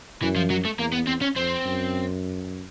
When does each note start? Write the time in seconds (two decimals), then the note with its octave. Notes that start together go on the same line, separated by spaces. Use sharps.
0.22 F#2 E3
0.36 F3
0.50 F#3
0.65 A3
0.79 E2 A#3
0.93 B3
1.07 C4
1.22 C#4
1.36 F2 C4
1.65 F#2